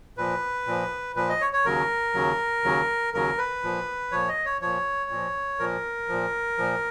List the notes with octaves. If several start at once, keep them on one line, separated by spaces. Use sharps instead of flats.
A#2 F3 B4
A#2 F3
A#2 F3 B4
D#5
C#5
C#5
D#2 C#3 F#3 A#4
D#2 C#3 F#3
D#2 C#3 F#3
D#2 C#3 F#3 A#4
B4
A#2 F3
A#2 F3 C#5
D#5
C#5
A#2 F3 C#5
A#2 F3
A#2 F3 A#4
A#2 F3
A#2 F3